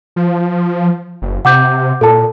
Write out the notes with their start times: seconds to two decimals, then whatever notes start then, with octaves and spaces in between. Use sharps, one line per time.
0.16 F3
1.22 F#1
1.45 C3 F#5 D6 G6
2.01 A#2 A4 A5